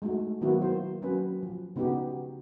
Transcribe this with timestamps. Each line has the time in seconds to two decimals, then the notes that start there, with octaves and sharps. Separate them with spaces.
0.02 G#3 A3 D#4 F#4
0.41 D#3 F#3 A#3 B3 E4 F#4
0.62 A#3 C5
1.02 F#3 A#3 C4 C#4 B4
1.43 F3
1.76 C#3 B3 D#4 F#4 G4